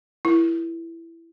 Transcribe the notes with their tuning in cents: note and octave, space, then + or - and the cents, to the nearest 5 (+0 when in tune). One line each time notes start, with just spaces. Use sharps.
E4 +15 A#4 +10